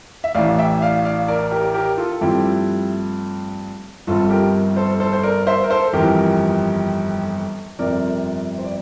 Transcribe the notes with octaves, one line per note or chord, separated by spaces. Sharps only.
E5
A1 A2 E3 D5 F5
E5 G5
D5 F5
D5 F5
A#4 D5
G4 A#4
G4 A#4
F4 A4
A4
G2 F3 A3 C4 E4 G4
G1 G2 F3 C4 F4 A4
G4 A#4
A4 C5
A4 C5
C5
A#4 D5
C5 E5
A#4
A4 C5
G1 F2 E3 G4 A#4
G1 F2 C3 A#4 D5
C5
D5